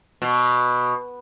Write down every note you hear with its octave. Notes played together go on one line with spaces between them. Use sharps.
B2